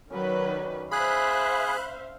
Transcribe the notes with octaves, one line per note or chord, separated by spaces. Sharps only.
D#3 F#3 C#4 B4 D5 F#5
G#4 C5 E5 F5 B5 F#6